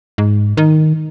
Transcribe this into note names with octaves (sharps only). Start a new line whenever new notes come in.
G#2
D#3